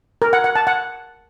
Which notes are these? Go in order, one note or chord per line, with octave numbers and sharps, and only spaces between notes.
A#4
F#5
F#5
A5
F#5